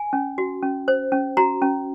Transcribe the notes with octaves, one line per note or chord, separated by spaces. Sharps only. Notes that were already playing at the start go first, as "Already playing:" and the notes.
Already playing: G#5
C#4
F#4
C#4
C5
C#4
F#4 A#5
C#4